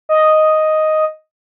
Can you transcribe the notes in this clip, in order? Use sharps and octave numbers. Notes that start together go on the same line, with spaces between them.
D#5